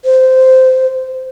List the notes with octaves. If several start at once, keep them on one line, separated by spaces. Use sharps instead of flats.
C5